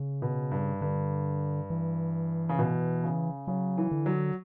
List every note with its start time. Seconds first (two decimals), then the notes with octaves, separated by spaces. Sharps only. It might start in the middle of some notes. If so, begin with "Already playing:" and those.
Already playing: C#3
0.22 B2
0.51 G2
0.81 G2 D3
1.70 E3
2.49 C#3
2.59 B2
3.04 C#3
3.47 C#3 F#3
3.78 E3
3.91 D3
4.06 F#3